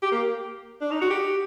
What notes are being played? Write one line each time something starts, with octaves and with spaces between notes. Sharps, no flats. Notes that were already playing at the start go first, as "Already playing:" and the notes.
G4
A#3
D4
D#4
F#4
G4